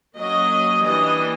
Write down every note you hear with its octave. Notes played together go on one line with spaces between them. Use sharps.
F#3 A#3 C#4 D#5
E3 G3 A#3 D4 D#5